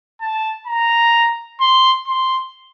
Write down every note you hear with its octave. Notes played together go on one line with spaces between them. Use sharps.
A5
A#5
C6
C6